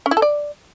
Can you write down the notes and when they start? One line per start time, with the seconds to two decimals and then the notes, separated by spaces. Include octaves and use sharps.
0.06 C#4
0.11 E4
0.17 A4
0.22 D5